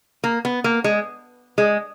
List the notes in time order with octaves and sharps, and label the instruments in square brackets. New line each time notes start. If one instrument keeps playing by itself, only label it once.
[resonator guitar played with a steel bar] A#3
B3
A#3
G#3
G#3